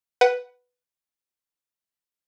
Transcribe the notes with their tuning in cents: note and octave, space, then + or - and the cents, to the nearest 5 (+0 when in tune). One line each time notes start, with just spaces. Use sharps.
B4 +0 F#5 +15